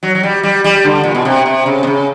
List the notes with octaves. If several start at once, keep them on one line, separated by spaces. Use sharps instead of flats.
F#3
F#3
G3
G3
G3
D3
A#2
B2
C3
C3
C#3
C3
C#3